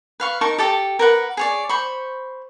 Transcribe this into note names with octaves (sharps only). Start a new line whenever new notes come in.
B4 F5 C#6
D#4 A#4 A5 C#6
G4 A4 A5 D6
A#4 B4 F#5
G#4 C#5 D5
C5 B5 C#6